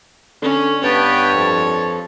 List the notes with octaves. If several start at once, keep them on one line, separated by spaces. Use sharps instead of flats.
D3 C#4
G2 B3 B4 C#5 G5 A5
F2